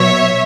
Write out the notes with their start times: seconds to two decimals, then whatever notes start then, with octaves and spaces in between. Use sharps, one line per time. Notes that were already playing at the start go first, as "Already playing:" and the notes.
Already playing: B2 F#3 C#5 E5